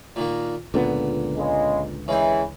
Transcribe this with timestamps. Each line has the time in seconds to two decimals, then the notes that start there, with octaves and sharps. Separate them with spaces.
0.16 A#2 D#3 A#3
0.74 C#2 A#2 D3 B3
1.37 C#3 G#3
2.08 C#3 E3 G#3 G5